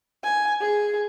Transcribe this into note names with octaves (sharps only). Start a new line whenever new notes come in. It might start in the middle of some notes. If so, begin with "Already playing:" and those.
G#5
G#4